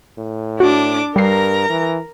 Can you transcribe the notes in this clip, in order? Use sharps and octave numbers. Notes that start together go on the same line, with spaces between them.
A2
D4 F#4 D6
G2 G3 A#4 A#5 C7
E3